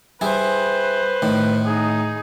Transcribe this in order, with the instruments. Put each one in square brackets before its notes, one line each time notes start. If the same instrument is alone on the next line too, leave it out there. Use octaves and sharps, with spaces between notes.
[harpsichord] G3 E4 G#4 [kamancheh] B4 C5
[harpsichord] A2 D#3
[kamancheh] D#4 G#4